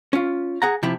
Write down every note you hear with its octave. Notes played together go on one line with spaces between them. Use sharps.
C#4 F4
G#4 F#5 A#5
C3 F3 E4 G4